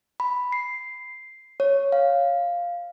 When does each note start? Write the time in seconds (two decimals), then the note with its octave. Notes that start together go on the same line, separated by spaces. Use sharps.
0.20 B5
0.52 C7
1.60 C#5
1.92 F5